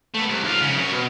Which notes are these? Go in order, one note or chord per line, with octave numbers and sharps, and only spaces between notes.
A3 B3
C2
G#2 F4
F2 C#3
F#2 C#5
B2